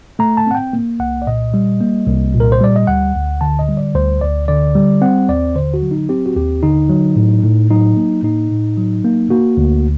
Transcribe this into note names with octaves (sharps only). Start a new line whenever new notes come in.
A3 A#5
A5
C4 F#5
G5
A#3
C2 F#5
D5
A#2 D#5
G3
A#3
C2
A#2
A#4
C5
G3 D5
D#5
D2 F#5
D2
D3 A5
D#5
G3
D5
D2 C5
D2 D5
D3 D5
G3
C4 F#5
D#2 D5
D3 C5
F#4
F#3
D#4
C4 G4
F#4
D#2 G4
D3 D#4
F#3
A2
A2
F#3 D#4
A#3
A2 D#4
A2
F#3
A#3
A#3 F#4
D2